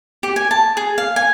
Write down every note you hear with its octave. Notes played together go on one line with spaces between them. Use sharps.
G4
G#5
A5
G#4
F5
G#5